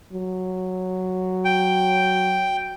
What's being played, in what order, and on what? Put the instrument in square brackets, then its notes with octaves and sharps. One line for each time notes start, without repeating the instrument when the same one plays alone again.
[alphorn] F#3
[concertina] G5